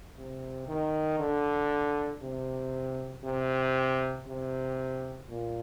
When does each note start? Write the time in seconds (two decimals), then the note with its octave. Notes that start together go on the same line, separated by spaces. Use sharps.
0.18 C3
0.68 D#3
1.19 D3
2.22 C3
3.25 C3
4.28 C3
5.29 A#2